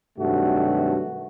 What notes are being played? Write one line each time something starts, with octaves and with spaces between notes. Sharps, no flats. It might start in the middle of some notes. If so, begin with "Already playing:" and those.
G2 C3 D#3 F#3 A3 F#4